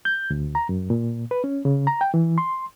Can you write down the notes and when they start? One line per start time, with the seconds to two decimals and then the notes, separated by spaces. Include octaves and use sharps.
0.05 G6
0.30 D2
0.55 A#5
0.69 F#2
0.90 A#2
1.31 B4
1.44 C#4
1.65 C#3
1.87 A#5
2.01 G5
2.14 E3
2.38 C6